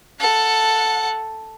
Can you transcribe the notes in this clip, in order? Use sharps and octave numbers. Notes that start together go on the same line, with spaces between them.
A4 F#5